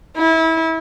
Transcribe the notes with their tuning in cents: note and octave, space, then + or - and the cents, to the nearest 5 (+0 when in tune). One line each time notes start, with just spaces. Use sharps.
E4 -25